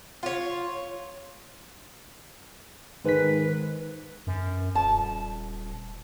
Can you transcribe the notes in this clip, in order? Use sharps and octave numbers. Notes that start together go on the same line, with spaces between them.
F4 C#5
G#2 D#3 B4 B6
F#2
D#1 A5